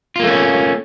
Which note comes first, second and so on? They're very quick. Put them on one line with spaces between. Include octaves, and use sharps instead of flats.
F4 A#3 A3 C#4